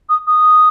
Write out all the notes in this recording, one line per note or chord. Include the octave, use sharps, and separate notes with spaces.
D#6
D#6